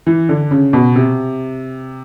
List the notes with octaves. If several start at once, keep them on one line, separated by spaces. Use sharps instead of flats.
E3
D3
C#3
B2
C3